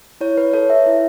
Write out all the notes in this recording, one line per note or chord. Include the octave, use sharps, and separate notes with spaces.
E4 C#5
B4
A4 C#5
E5
E4